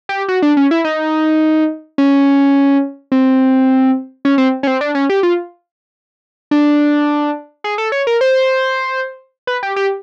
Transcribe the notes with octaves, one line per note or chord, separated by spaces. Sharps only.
G4
F#4
D4
C#4
E4
D#4
C#4
C4
C#4
C4
C#4
C4
D4
C#4
G4
F4
D4
G#4
A4
C#5
A#4
C5
B4
G4
G4